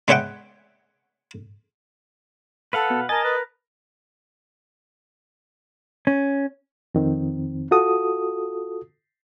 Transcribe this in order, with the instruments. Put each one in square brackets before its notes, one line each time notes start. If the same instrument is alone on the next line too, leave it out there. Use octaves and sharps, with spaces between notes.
[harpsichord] G#3 B3 C#5 E5 F#5 G5
[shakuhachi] A4 [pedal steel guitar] B4 F5 F#5
[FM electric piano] B2
[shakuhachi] A#4 [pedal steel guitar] D#5 [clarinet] G#5 [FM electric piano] A5 A6
[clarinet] B4
[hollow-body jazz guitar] C#4
[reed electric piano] F2 D#3 C4
F4 F#4 A4 D#6